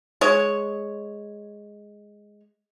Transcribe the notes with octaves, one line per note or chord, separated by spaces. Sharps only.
G#3 C#5